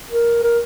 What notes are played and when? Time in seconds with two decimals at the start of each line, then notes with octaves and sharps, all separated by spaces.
0.10 A#4
0.43 A#4